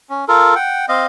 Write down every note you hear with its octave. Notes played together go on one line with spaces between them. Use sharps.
C#4
F4 A4 A#4
F#5 G5
C4 D#5 F5